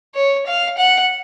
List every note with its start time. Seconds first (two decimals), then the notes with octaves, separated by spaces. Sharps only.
0.15 C#5
0.46 F5
0.78 F#5